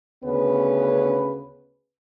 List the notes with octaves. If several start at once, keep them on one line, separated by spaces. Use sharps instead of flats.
D2 C#3 B3 C#4 B4